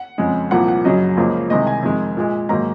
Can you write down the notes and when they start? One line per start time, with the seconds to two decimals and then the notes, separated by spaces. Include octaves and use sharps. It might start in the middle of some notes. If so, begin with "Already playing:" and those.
Already playing: F#5
0.18 F2 C#3 G#3
0.51 C2 A#2 F3 A#3 F#5
0.68 F#5
0.85 F#2 C#3 F#3 D#5
1.17 C#2 C#3 F3 A#3
1.50 C2 C3 D#3 G#3 D#5
1.67 G#5
1.83 F2 D#3 G#3
2.17 A#2 G#3
2.49 G#2 D#3 F#3 A#3 A#5